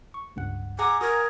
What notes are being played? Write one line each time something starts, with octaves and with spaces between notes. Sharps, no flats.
C#6
C#2 G2 F#5
G#4 F#5 G#5 A#5 D6 E6
F#4 A#4 D#6 G#6